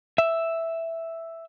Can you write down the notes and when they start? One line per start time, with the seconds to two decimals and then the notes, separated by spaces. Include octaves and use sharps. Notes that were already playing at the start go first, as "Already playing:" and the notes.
0.18 E5